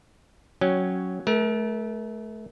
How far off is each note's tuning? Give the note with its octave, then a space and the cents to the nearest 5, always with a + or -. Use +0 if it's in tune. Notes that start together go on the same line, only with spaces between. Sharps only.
F#3 +0 C#4 -5 G5 -5
A3 -25 A#4 +30